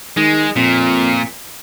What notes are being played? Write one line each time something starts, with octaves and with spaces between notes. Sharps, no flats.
D#3 G#3
F2 A#2